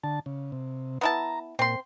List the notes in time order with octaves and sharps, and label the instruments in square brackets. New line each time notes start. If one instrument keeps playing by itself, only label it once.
[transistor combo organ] D3 A5
C#3
C3
[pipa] B3 E4 A5 [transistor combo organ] A#5
[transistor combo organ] A#2 [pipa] C4 C6